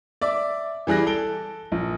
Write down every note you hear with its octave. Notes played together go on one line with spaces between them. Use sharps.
D5 E5 D6
E3 G3 G#4 F#6 A#6
A4 D7 G7
A#1